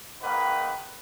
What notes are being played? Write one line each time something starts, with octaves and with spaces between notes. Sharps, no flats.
G#2 D#3 A#3 B4